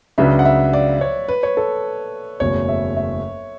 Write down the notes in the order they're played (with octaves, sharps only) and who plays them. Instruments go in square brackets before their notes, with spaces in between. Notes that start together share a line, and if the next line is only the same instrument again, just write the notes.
[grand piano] C#2 C#3 F#3 B3 D4 [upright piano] E5
[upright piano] F#5
E5
D5
C#5
B4
C#5
A4
[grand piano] F#1 E2 B2 A3 [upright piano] C#5
[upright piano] E5
E5